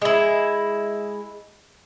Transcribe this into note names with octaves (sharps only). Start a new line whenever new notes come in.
G#3 E4